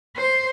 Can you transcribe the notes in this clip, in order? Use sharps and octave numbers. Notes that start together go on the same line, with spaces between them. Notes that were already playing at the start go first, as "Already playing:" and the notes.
C5